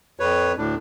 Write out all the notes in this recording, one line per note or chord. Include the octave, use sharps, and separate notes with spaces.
F2 B4 C#5
D2 A2 D4